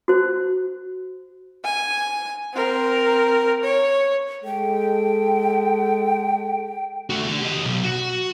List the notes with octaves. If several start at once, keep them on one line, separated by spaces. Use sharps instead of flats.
F#4 C5
G#5
C4 A#4
C#5
G#3 A4 G5
A3 F#4
D3
G4 D#5
B1
F#4